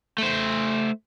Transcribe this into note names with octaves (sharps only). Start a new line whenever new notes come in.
A3 C5